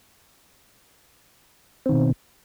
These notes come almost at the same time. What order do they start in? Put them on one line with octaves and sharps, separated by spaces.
C4 D#3 B2